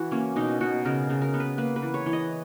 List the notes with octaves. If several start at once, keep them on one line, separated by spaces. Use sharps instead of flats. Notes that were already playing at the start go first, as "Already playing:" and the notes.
Already playing: E3 F#4
A#3 C#4
B2 D#4
B2 F#4
C#3 A#4
C#3
A#4
B3
B4
A#3 B4
B4
E3
C#5
E3
D#5